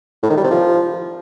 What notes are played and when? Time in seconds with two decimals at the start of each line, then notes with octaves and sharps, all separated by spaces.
0.23 A2
0.30 D#3
0.37 G3
0.44 C3
0.51 F3